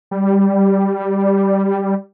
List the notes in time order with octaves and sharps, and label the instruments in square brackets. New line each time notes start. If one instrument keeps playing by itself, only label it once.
[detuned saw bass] G3